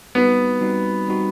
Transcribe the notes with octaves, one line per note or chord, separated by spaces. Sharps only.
G3 B3 C4 D#4 F#4
G3 C4 D#4 F#4
G3 C4 D#4 F#4